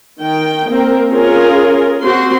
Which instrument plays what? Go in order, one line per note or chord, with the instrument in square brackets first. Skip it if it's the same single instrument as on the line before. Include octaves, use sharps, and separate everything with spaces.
[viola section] D#3 G5
A#3 C4 A#4
C#4 F4 G#4 A#4
C4 F#4 C6